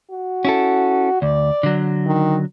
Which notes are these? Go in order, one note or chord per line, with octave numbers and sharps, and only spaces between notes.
F#4
C#4 E4 A4
D2 D5
D3 F#3
D#3